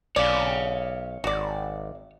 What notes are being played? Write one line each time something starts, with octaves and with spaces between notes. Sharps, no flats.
B1 C#5 D5 F5
G#1 F#4 D5